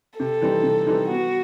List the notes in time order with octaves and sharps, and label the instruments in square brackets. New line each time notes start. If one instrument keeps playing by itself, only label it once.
[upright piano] C3 [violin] A4
[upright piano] E3 G3 C4 D#4
C3
E3 G3 C4 D#4
[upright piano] B3 [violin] F#4